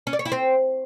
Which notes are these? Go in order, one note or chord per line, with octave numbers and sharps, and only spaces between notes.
C#4
D5
C#5
E4
C4